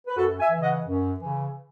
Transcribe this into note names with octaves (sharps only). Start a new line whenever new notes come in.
B4
F#2 F#4 A4
E5 G#5
C#3 E3
D#5 F#5
F#2
C#3 E3